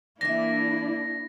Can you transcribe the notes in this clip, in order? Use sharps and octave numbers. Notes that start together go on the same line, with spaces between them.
E3 A#3 D4 E4 E5 A#6